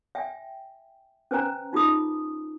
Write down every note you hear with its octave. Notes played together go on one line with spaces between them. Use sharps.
E5 G5 G#5
C#4 B4 C5 G#5 A#5
D#4 F4 G#4 D#6